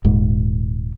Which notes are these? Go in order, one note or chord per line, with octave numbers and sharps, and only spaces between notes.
D#1 G#2